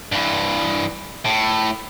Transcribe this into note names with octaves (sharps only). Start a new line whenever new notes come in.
G2 E3
A2